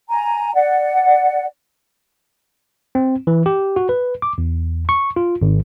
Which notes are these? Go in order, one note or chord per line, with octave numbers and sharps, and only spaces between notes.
G#5 A#5
D5 F#5
C4
E3
G4
F#4
B4
D6
E2
C#6
F4
G#1